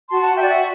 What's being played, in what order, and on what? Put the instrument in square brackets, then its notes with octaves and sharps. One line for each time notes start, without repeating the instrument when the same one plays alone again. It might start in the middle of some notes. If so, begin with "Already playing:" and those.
[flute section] F#4 A5 C6
F#5 A5
F#4 E5 G5
D5
E5